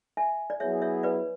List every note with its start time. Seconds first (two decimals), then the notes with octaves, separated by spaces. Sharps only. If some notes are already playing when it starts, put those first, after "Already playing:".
0.17 E5 G#5
0.50 D5
0.60 F#3 B3 E4 G#4 C#5 E5
0.82 C#5 E5
1.03 B4 D5